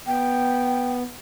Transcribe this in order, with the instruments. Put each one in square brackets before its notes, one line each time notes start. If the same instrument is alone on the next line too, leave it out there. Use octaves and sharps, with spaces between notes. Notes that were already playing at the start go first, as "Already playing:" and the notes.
[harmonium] B3 [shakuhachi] G5